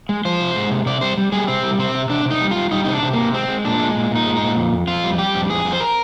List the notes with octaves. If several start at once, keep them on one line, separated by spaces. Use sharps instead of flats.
G#3
F3 C5
C3
G#3
C3
C3 D5
G3 C5
G3
G3 G#4
C3 C4
G3
C3 C4
C3
C3 D4
C3
D#4
G3
G3 F4
G3 D#4
C3 D#4
D4
C3
C3 A#3
G#3 C4
G#3
A#2 D4
G#3
A#2
A#2 D#4
G#3
D#4
A#2
F2
F2
F2 F4
G3
G3 G4
F2
F2 G#4
F2
C5
A#4